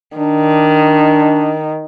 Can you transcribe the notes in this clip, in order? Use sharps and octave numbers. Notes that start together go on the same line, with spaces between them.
D#3 D4